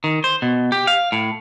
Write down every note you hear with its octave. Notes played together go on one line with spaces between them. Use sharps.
D#3
C5
B2
G4
F5
A2